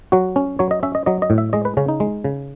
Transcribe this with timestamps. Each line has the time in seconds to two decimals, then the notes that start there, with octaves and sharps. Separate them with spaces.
0.12 F#3 F#4
0.36 C#4
0.59 F#3 C#5
0.71 D#5
0.83 C#4 E5
0.95 D#5
1.06 F#3 D#5
1.22 D#5
1.30 A2
1.38 E5
1.53 G#3 D#5
1.65 B4
1.77 C#3 C#4
1.88 D#4
2.00 G#3
2.24 C#3